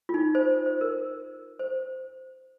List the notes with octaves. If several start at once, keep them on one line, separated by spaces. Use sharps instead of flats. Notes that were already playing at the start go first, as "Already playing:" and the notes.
F4
D#4
C5
C5
A#4
C5